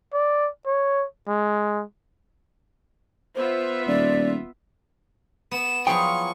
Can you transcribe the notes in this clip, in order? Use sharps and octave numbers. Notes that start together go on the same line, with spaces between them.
D5
C#5
G#3
B3 F4 C5 E5
D#1 D5
B3 E7
F3 F#3 E4 F4 G#4 G5 C#6